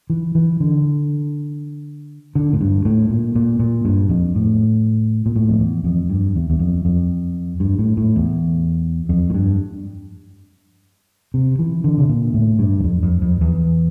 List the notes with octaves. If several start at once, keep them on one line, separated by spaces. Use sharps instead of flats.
E3
E3
D3
D3
A2
G2
A2
A#2
A#2
A#2
G2
F2
A2
A#2
A2
F2
E2
F2
G2
E2
E2
F2
F2
G2
A2
A2
E2
F2
A2
G2
C3
E3
D3
C3
A#2
A2
G2
E2
F2
F2
F2
E2